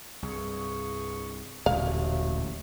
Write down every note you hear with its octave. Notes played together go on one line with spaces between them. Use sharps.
C2 G2 G#4 C#6
D#1 A1 D#2 B2 D3 G#3 A3 F5